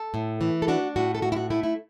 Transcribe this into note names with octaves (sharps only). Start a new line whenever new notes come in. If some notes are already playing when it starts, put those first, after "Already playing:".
Already playing: A4
A2
E3
A4
D4 F#4
A2 F#4
A4
A2 F#4
E4
F#4
A3 E4
E4